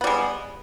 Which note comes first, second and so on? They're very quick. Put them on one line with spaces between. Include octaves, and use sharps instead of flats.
B3 G3 G#3